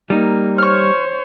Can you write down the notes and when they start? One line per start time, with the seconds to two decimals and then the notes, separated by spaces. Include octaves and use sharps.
0.10 G3 A#3 D#4
0.58 C5 C#5 C#6 F6